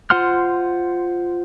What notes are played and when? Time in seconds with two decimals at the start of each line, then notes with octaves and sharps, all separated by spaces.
0.10 F4 C5 F#5 C6 F6